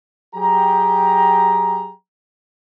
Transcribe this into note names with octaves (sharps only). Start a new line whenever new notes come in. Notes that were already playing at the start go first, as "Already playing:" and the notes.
F#3 G4 G#4 G5 A#5